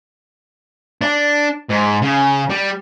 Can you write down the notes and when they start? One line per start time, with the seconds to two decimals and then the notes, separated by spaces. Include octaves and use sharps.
1.02 D4
1.69 G#2
2.02 C#3
2.50 G3